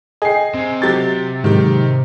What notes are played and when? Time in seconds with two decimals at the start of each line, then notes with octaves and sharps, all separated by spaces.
0.22 G#4 D#5 G5 C7
0.55 C3
0.82 F#3 G4 A6
1.44 G#2 D#3 F#3 G4